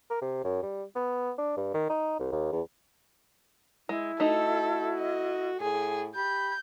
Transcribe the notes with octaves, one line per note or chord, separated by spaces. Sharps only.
A#4
C3
F#2
G3
B3
D4
G2
D#3
D#4
C2
D#2
E2
G#3 E4
A3 D#4 F#4 A4
D#5
A2 G#4
G4 B5 G6